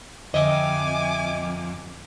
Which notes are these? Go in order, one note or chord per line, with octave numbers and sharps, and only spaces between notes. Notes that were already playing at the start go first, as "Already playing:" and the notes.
F2 D3 D#5 E5 G5 G#5 D6